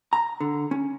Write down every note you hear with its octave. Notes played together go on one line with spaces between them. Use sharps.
A#5
D3
C#4